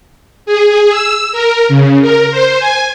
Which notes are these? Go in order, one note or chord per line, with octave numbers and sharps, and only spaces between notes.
G#4
E6
A#4
C#3
A#4
C5
G#5